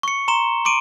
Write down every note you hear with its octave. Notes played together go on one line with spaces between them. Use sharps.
C#6 C#7
A#5 C6 E7 G7
C6 D6 D7 D#7